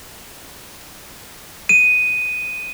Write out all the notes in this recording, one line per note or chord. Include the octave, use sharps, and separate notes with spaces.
D#7